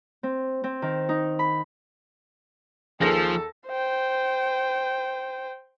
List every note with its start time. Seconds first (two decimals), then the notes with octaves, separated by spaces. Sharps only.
0.23 C4
0.64 C4
0.82 D#3
1.09 D#4
1.39 B5
3.01 D#2 F3 G#4 A4 A#6
3.67 C5 G5